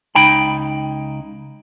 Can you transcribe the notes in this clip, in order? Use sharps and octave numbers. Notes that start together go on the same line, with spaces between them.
C#2 D#4 G5 B5